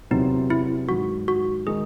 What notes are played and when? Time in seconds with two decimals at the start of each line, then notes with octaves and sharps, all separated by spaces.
0.11 E2 C3 F#3 C4 D#4
0.50 E4
0.89 G#2 D#3 F#3 F#4
1.28 F#4
1.67 D#3 G#3 D#4 G#4